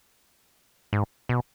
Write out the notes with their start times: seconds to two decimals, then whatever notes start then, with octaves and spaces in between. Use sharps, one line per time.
0.93 G#2
1.29 B2